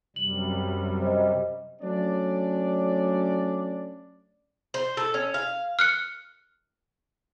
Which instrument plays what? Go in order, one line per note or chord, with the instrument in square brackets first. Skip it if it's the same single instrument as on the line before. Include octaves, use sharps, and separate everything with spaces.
[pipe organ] F#2 C3 G3 [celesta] F#7
[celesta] C5 D#5
[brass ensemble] F#3 A3 C#4 D4 D5
[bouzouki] C5
A4
C#4
F5
[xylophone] F6 F#6 C#7